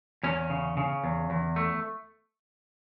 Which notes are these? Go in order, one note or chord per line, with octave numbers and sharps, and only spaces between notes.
E2 C#4
C#3
C#3
E2
E2
A3